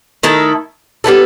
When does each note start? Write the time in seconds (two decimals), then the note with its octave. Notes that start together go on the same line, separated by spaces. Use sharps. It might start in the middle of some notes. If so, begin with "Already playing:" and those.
0.23 D#3 A3 E4 A4
1.04 G3 B3 E4 A4